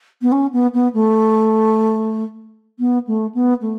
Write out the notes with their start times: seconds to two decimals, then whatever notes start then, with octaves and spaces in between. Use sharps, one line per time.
0.21 B3
0.32 C#4
0.52 B3
0.73 B3
0.93 A3
2.79 B3
3.07 A3
3.34 B3
3.61 A3